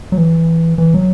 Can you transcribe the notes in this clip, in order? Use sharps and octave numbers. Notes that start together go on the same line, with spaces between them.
F#3
E3
E3
F#3